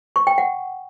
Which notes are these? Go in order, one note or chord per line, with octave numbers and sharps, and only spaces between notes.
C#6
G5
F#5